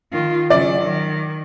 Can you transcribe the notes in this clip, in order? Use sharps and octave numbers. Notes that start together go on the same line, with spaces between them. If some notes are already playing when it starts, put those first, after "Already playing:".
D#3 F4
C#3 F#3 D5
D#3